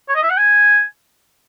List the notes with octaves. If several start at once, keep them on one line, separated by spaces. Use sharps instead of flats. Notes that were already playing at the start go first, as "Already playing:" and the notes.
C#5
D#5
E5
F#5
G#5